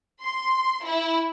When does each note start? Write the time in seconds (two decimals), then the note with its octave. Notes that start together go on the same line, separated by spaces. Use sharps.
0.22 C6
0.84 E4